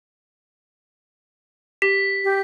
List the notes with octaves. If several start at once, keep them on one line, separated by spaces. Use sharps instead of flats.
G4 B6
G4